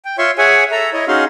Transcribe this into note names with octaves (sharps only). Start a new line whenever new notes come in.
G5
F4 C#5 E5 C6 C#6
G#4 C#5 E5 F#5 G#5
A4 E5 A#5
E4 C#5 D#5
C#4 D#4 F#4 G#4 F5 C6